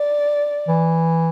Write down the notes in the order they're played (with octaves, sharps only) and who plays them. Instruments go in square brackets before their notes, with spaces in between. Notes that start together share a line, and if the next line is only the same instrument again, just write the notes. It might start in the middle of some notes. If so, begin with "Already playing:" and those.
Already playing: [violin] D5
[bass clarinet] E3